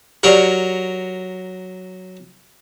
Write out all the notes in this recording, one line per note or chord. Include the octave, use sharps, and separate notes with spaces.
F#3 G4 A#4 D5 C#6